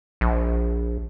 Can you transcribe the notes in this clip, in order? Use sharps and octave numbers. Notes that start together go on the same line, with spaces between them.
A#1